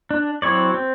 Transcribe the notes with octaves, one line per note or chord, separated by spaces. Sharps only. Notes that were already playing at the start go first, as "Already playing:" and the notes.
D4
F#3 C4 E4 C#5 D5
C4